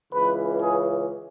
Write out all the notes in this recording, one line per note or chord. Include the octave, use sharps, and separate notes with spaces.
C#2 C#3 E3 B4
G#4